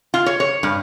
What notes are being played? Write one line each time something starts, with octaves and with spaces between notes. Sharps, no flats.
F4
C#5
C#5
G2